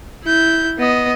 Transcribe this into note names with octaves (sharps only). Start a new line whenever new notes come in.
E4 G6
B3 D#5